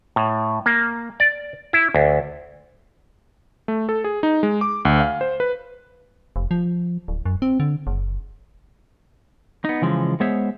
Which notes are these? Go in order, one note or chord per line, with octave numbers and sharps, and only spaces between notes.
A2
A#3
D5
E4
D2
A3
A4
G#4
D#4
G#3
D6
D2
F5
C5
B4
F1
F3
D1
F#2
C4
D3
F#1
B3 D#4
C#3 E3 F3 G#3
G#3 B3 G#4 C5 C#5 E5